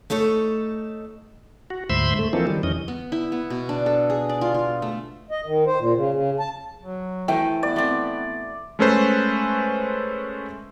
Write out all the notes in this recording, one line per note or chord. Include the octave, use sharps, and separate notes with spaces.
A3 D#4 A4 C#5
F#4
D2 G#2 C5 E5 B5 C6
A3
E3 F3 A#3 C4 D#4 A4
D#3 G3
F2 E3 C#4 D#5
B3
E4
B3
B2
D4
A4
G#4
D5
F4
F4
A3
D#5
D#3
C5
A#2
C#3
C#3
A5
F#3
E3 A3 F#4 C5 G5
B3 D5
A3 C4
G#3 A3 C#4 A4 B4 C5